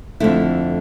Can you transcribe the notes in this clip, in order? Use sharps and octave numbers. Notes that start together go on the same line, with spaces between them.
F2 D3 A3 E4